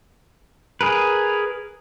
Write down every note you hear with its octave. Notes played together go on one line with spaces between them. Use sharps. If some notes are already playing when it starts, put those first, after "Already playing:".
G#4 A#4 B4